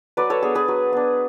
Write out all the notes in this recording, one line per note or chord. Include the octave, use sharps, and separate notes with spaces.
F#3 B4 D5
A4 C#5
B3 D4 G#4
G#4 B4
F#3
B3 D4